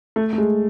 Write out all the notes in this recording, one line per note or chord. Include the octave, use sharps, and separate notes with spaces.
A3
A3
G#3